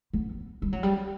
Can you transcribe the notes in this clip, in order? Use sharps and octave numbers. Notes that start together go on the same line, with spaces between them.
B3
G3
F#3
G3